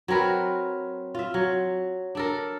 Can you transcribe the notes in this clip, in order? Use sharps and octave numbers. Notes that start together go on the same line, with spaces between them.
F#3 C4 A#4 B4
F4 E5
F#3
D4 A4 A#4